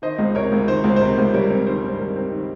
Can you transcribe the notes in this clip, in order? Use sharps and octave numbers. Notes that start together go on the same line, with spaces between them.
D#3 C5 D#5
C#2
C3 A#4 C#5
C#2
D#3 C5
C#2
C5
C3 A#4
C#2
G3 A#4 C#5
C4
D#3 C5
G2
G3 A#4
C4
D#3